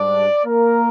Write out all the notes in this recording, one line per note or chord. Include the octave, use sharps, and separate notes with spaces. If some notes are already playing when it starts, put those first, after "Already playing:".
Already playing: G#2 G3 D4 D5
A#3 A#4